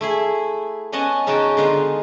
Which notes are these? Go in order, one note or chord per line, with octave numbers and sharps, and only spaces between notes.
A3 E4 G#4
B3 C#4 D#5 F#5 G#5 A5
C#3 C#4 D#4 F#4 G5 A5
D3 G#3 B3 D#4 F4